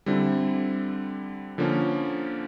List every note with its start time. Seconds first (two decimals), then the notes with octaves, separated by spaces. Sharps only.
0.06 D3 G3 C4 E4
1.58 D3 F3 A#3 C#4